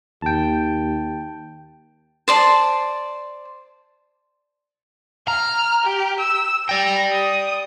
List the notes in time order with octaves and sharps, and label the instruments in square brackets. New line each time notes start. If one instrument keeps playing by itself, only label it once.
[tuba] D#2 [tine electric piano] G5 A5
[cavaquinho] C5 D5 A5
[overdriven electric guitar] A#5 [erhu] F6
[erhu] G4
E6
[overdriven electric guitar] D5 G5 [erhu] A#5
[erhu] D#6